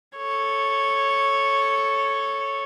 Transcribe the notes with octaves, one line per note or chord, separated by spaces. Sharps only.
A4 C#5